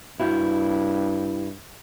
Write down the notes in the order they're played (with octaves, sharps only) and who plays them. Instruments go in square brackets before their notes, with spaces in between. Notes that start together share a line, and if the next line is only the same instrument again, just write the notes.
[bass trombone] G2 [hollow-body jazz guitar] E4 F#4 G4